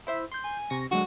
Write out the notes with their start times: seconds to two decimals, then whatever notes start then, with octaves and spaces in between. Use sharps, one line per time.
0.07 E4 C5 E5
0.32 C6 G6
0.44 G#5
0.70 C3 C#6 A#6
0.91 D3 F#3 G#3 F#4